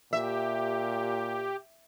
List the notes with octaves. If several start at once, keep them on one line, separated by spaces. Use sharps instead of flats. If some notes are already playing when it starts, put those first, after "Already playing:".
A#2 G4 E5